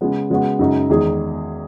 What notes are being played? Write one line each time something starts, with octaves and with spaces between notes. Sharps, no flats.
C#3 G#3 B3
C#3 G#3 B3 F#4
F#2 C#3 G#3 D#4 F#4
E2 D#3 G#3 D#4 G#4